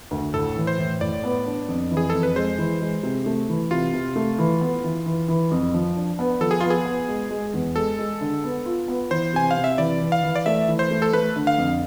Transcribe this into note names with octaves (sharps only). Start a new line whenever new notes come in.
D2
A2 A4
E3
C5
A2
A2 D5
B3
D4
F2
E3
G#4
F2 A4
B4
G#3 C5
E3
G#3
C3
A3
E3
C3 F4
C3
A3
E3
B3
E3
E3
E3
F2
F3
D4
B3
F3 A4
G#4
B3 F4
G#4
B3
G#3
G#3
E2
G#3 A4
G#3
D3
B3
F4
B3
E3 C5
C3 G#5
F5
C3
E5
E3 D5
E3
F5
E3
D5
A3 E5
E3
C5
A3
A4
A3 B4
D3
F5
F2